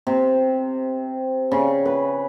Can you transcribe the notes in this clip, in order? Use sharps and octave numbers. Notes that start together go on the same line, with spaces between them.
C3
C#3
B4